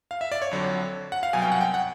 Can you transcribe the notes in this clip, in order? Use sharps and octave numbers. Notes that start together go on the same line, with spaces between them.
F5
E5
D5
C#5
F2 D3 F#3
F#5
F5
C2 B2 F#3 G#5
G5
F#5
G5
F#5